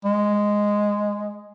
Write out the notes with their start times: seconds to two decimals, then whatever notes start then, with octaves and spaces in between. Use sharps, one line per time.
0.05 G#3